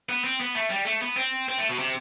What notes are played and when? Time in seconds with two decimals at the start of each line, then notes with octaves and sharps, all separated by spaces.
0.09 B3
0.24 C4
0.40 B3
0.55 A3
0.71 G3
0.86 A3
1.02 B3
1.17 C4
1.48 C4
1.59 A3
1.69 B2
1.79 C3